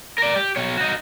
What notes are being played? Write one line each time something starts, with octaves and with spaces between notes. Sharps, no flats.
A#4 D5
G4
B2 C#5
D#4 F#4